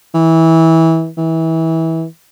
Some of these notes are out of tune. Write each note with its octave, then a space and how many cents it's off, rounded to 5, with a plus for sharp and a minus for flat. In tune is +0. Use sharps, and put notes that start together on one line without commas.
E3 -20
E3 -25